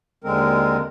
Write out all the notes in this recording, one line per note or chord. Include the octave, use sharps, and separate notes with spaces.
D#2 D3 G#3 C4 A#4